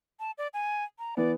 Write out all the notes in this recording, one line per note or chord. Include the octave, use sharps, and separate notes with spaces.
A5
D5
G#5
A#5
E3 B3 D5